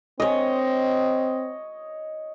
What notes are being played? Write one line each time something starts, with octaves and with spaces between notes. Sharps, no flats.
C4 C#5 D#5